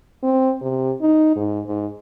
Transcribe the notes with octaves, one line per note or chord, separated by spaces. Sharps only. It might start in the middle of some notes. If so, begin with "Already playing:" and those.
C4
C3
D#4
G#2
G#2